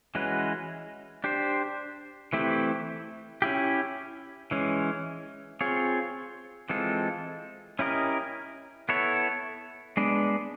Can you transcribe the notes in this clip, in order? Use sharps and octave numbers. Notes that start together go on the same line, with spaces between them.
E3 G#3 C#4 F#4 B4
D4 G4 C5
E3 A3 C4 E4 G4
C#4 E4 G4
E3 G#3 C#4
C4 F4 G#4 C#5
E3 G#3 C4 F4 A4
C#4 E4 G4 A#4 D#5
B3 E4 A4 C#5
G#3 B3 D4